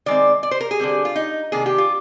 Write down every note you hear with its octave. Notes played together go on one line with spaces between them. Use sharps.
D#3 G#3 C4 D5
D5
C5
A#4
G#4
D3 G3 C4
F4
D#4
C3 D#3 A#3 D4 G#4
G4
F4